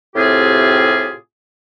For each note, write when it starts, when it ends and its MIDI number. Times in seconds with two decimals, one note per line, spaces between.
0.16 1.13 45
0.16 1.13 48
0.16 1.13 60
0.16 1.13 65
0.16 1.13 67
0.16 1.13 68